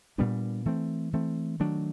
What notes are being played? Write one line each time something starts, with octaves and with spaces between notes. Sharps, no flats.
A#2 G3 B3 D4
E3 A3 C4
E3 A3 C4
D#3 F#3 A3 D4